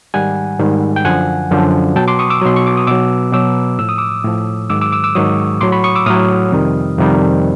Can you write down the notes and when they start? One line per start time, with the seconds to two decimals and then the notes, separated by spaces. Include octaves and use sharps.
0.14 G#2 D#3 G3 F#5 G#5
0.59 G#2 D#3 G3
0.96 G5
1.04 F#2 D3 F3 F#5 G#5
1.51 F#2 D3 F3
1.96 B2 F#3 G5 A5
2.08 C6 D6
2.19 C#6 D#6
2.30 D6 E6
2.42 B2 F#3 C6
2.56 C#6
2.67 D6
2.77 D#6
2.87 B2 F#3 D6 E6
3.33 B2 F#3 D6 E6
3.79 A2 F3 E6
3.89 D#6
3.98 D6 E6
4.24 A2 F3
4.70 G#2 D#3 F#3 D6 E6
4.81 D6 E6
4.92 D6 E6
5.04 D6 E6
5.15 G#2 D#3 F#3 C#6 D#6
5.61 A2 F#3 C6 D6
5.72 B5 C#6
5.84 C#6 D#6
5.95 D6 E6
6.06 A2 F#3 D#6 F6
6.52 F2 C3 D#3 G3
6.98 F2 C3 D#3 G3